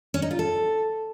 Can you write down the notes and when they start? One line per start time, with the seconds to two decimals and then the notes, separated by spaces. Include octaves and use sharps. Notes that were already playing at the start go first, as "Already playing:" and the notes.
0.14 C#4
0.22 D#4
0.31 F4
0.39 A4